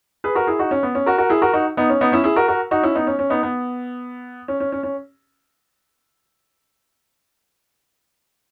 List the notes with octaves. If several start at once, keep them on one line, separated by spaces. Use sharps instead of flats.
G#4 B4
F#4 A#4
E4 G#4
D#4 F#4
C#4
B3
C#4
F#4 A#4
F#4 A#4
E4 G#4
F#4 A#4
D#4 F#4
B3 D#4
C#4
B3 D#4
C#4 E4
E4 G#4
F#4 A#4
F#4 A#4
D#4 F#4
C#4 E4
B3 D#4
C#4
C#4
B3 D#4
B3
C#4
C#4
C#4
C#4